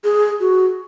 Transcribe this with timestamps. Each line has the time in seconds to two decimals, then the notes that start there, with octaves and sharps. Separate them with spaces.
0.04 G#4
0.40 F#4